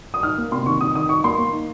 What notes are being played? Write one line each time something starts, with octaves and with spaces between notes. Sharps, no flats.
D#6
D#4 F6
A#3
C3 C6
D#3 C#6
D#4 D#6
D#3 D#6
D#4 C#6
A#3 C6
A#3
D#4